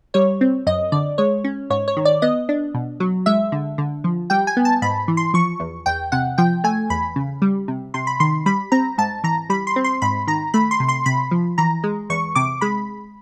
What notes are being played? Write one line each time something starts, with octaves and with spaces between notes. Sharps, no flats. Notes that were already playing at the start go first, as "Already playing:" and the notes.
G3 C#5
C4
F#2 D#5
D3 D5
G#3 C#5
C#4
G#2 C#5
C#5
D#3
D5
B3 D#5
D4
B2
F#3
G#3 E5
D3
D3
F3
G3 G5
G#5
B3
A5
G#2 B5
E3
C6
F3 C#6
E2
E2 G5
C3 F#5
F3 G5
A3 G#5
E2 B5
C#3
G3
C3
C3 C6
B5
D#3 C6
G3 B5
C4 A#5
G#2 A5
E3 A#5
G3 B5
C6
C4
C6
G#2 B5
D#3 A#5
A3 B5
C6
C3
C6
C3 B5
F3
E3 A#5
G#3
E2 C#6
C3 D6
G#3 B5